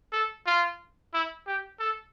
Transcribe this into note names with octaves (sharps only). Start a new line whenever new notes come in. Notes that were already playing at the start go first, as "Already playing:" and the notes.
A4
F4
E4
G4
A4